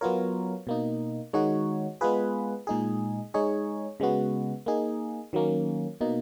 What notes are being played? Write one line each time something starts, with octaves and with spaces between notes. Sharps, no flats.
F#3 B3 F4 A#4 C#5
B2 A#3 D#4
D#3 G#3 D#4 F#4 C#5
G#3 B3 F4 G#4 B4
A#2 G#3 D#4 G#4
G#3 D#4 G#4 C#5
C#3 G#3 B3 F#4
A#3 D#4 G#4
D#3 F#3 A#3 C#4
B2 A#3 D#4